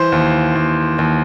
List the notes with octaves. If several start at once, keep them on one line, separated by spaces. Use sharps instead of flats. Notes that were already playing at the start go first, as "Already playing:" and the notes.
Already playing: E3 C5
D#2
D#2
D#2